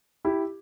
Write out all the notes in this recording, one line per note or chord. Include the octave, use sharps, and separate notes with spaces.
E4 G4